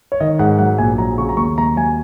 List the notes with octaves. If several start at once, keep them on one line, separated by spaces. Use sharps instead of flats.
C#5
D#3 D#5
G#2 F#5
F#3 F#5
A#1 G#5
F#3 A#5
C#3 C#6
A#5
D#2 C#6
D#2 A#5
F#3 G#5